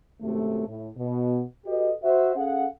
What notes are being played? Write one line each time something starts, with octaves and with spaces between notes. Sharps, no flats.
G#1 F#2 C3 A3
A2
B2
F#4 G4 A4 B4 D#5
F#4 C5 E5
C#4 G#4 A4 F5 F#5